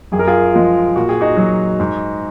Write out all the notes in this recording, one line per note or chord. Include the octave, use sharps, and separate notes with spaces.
F#2 G#4
A#4
F4 G#4
F3 G#3
A#2 F#4
G#4
D#4 F#4
F#3
G#2